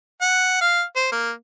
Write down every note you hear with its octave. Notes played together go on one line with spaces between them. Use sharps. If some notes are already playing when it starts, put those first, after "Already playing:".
F#5
F5
C5
A#3